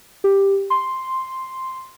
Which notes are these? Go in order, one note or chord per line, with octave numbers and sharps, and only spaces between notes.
G4
C6